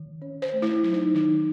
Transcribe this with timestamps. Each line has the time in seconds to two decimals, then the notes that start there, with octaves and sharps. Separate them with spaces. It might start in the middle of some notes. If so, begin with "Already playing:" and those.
Already playing: D#3
0.22 C#4 C#5
0.42 C5
0.53 A3
0.62 E4
0.83 F#3 E4
0.94 D#4
1.14 D#3 D#4